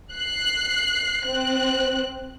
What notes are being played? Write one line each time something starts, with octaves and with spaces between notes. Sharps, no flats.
F#6 C7
C4 F#6